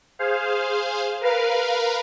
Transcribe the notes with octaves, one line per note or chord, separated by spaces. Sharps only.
G#4 C5 F5
A#4 B4 F5